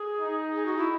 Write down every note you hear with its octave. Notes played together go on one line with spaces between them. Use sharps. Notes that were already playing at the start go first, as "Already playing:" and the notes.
Already playing: G#4
D#4
G#4
F#4
E4